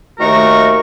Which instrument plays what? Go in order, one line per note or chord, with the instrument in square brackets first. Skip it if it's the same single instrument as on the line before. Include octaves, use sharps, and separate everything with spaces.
[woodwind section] D#2 D#3 A3 F#4 A#4 C#6